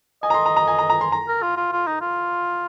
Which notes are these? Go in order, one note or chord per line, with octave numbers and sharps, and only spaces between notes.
D#5 G#5
A#5
C6
A#5
A#5
G#5
A#5
A#5
C6
A#5
A#4
F4
F4
F4
D#4
F4